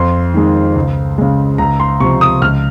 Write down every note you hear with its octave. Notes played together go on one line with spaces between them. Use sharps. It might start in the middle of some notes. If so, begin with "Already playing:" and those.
Already playing: F2 C6
D#3 G#3
C#2
C#3 G#3
C#2 A#5
C6
C3 F3 C#6
D#6
C#2 F6